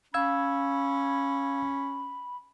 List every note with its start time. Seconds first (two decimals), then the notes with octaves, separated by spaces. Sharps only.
0.14 C#4 F5 B5 E6 G#6